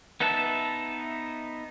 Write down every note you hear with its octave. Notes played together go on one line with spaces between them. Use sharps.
B3 D#4 B4 E5 A5